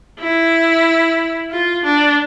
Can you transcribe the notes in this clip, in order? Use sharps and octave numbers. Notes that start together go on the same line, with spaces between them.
E4
F4
D4